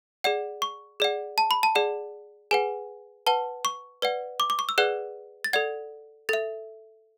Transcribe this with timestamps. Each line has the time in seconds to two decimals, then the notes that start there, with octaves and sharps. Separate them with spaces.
0.24 G#4 D5 F#5
0.62 C#6
1.00 G#4 D5 F#5
1.38 A5
1.51 B5
1.63 A5
1.75 G#4 D5 F#5
2.51 G#4 B4 F#5 G#5
3.27 B4 F#5 A5
3.65 C#6
4.02 B4 D5 F#5
4.40 D6
4.50 D6
4.59 C#6
4.69 E6
4.78 G#4 B4 D5 F#5 F#6
5.44 A6
5.53 A4 D5 F#5 G#6
6.29 A4 E5 A6